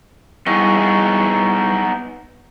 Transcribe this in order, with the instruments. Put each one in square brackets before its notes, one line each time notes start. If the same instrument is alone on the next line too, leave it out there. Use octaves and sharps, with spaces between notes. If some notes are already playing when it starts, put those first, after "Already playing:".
[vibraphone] G3 E4 C#6 [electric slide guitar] B3 D#4 G#4